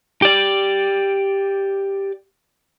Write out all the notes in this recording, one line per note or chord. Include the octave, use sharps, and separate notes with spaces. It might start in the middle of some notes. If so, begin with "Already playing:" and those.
G4 D5